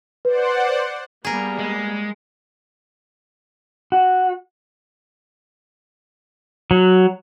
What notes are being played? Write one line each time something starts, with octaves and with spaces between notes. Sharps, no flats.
B4 C5 D5 F#5
G3 A#3 B3 G#4 A#4
G#3
F#4
F#3